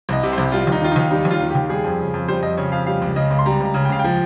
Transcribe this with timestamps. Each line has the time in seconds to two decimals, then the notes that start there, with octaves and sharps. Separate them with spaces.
0.09 C2 D#5
0.23 C3
0.33 C5
0.38 C2
0.52 G3 F4
0.67 D#2
0.72 D#4
0.82 D#3 F4
0.91 D#2 D#4
1.11 G3 D#4
1.25 D#2
1.31 F4
1.41 D#3
1.50 G4
1.55 D#2
1.69 G3 G#4
1.84 F2
1.99 C#3
2.14 F2
2.28 G3 C5
2.42 F2 D#5
2.57 C#3 C#5
2.72 F2 F5
2.87 G3 F5
3.02 C#2
3.16 C#3 D#5
3.31 C#2
3.39 C6
3.46 G3 A#5
3.60 C#2
3.65 A#5
3.74 C#3
3.85 G5
3.89 C#2 F5
3.99 G5
4.04 F3